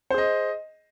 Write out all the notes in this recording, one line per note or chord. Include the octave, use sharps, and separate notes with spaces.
G#4 C5 D#5